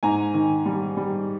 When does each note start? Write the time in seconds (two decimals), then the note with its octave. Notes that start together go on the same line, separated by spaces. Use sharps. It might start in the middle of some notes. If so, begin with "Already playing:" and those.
0.03 G#2 G#5 A#5
0.34 D#3
0.66 G3
0.97 G3